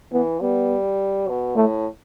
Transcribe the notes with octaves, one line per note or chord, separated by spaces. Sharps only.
E3 B3
G3 B3
B2
A2 A3